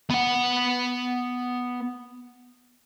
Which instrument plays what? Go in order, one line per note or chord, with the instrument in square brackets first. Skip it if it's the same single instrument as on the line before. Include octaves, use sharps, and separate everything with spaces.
[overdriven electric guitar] B3 F#5